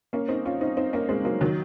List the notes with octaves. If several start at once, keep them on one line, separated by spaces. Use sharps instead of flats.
A#3 C#4
C4 D#4
C#4 F4
C4 D#4
C4 D#4
A#3 C#4
G#3 C4
F#3 A#3
D#3 F#3